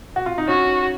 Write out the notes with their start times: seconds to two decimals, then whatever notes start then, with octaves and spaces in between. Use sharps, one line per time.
0.16 F#4
0.26 F4
0.38 D#4
0.48 C#4 F#4